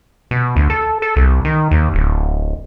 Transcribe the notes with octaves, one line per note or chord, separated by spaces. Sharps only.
B2
D2
A4
A4
C2
D#3
D#2
D1